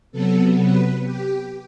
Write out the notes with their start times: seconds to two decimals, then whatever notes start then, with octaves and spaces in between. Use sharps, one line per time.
0.12 C3 F#3 B3 A4
0.59 B4
1.04 G4